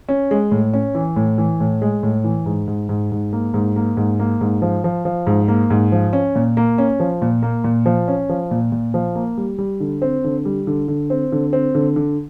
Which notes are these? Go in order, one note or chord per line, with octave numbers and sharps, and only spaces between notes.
C#4
G#3
A2
C#4
E3
A2
E3
A2
G#3
A2
E3
G#2
G#2
G#2
G#2
A#3
G#2
A#3
G#2
A#3
G#2
F3
F3
F3
G#2
A#3
G#2
F3
C#4
A#2
A#3
C#4
F3
A#2
A#3
A#2
F3
C#4
F3
A#2
A#2
F3
A#3
G3
G3
D3
C4
D3
G3
D3
D3
C4
D3
C4
D3
D3